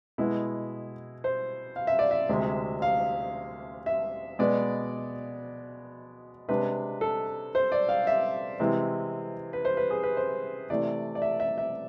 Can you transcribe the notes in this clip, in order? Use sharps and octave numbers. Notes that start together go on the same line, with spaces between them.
B2 G#3 B3 E4
C5
F5
E5
D5
E5
D2 C3 G#3
F5
E5
B2 G#3 B3 D5
C3 G#3 D4 B4
A4
C5
D5
F5
E5
C3 E3 G#3
B4
C5
B4
G#4
B4
C5
C3 E3 A3 D5
D5
E5
E5
E5